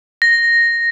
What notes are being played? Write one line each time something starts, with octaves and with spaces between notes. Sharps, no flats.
A#6